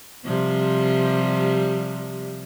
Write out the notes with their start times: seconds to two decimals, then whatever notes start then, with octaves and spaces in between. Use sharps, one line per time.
0.24 C3 F3 G3